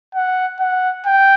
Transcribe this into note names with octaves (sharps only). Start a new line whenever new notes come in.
F#5
F#5
G5